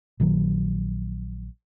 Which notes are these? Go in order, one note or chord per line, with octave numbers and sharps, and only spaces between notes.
A#1 D#3 F#3